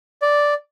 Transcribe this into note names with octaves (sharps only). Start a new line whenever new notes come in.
D5